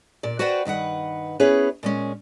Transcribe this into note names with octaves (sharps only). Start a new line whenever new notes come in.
A#2 D5
F#4 B4 C5 D5 F#5 G5
G2 D#3 B4 F#5
B3 C#4 E4 G#4 B4 C#5
A#2 G#3 C#4